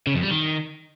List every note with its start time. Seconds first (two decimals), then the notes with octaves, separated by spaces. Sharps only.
0.07 C#3
0.15 F2
0.23 G3
0.31 D#3